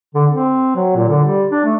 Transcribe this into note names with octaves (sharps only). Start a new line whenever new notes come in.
D3
C4
F#3
A#2
D3
G3
D4
A3